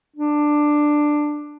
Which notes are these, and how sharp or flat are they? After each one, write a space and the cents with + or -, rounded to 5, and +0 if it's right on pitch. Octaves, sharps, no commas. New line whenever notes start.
D4 +10